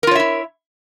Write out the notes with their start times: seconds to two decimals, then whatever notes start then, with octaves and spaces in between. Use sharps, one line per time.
0.03 A#4
0.07 F4
0.11 C#5
0.15 E5
0.20 E4